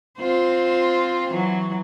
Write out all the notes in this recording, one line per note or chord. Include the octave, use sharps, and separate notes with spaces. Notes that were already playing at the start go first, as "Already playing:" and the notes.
C4 F4 C5
E3 F#3